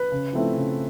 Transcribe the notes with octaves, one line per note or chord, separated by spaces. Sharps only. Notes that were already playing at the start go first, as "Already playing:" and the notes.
Already playing: B4
C#3
F3 A3 C4 E4
C#3